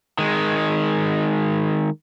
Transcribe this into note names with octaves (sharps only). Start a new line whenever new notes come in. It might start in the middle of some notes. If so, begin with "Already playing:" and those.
D#3 G#3